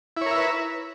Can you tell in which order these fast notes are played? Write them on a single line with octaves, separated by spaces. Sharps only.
E4 C#5 A#4 E5 B4